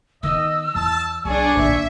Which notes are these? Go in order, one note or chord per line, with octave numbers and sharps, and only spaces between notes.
D#3 B3 D#5 E6
E2 A5
B1 D4 G#4 D5 G#5 C#6
A#1 D#3 E5